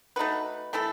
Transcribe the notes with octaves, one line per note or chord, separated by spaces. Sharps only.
A3 D#4 F#4 B4
E3 A3 E4 A4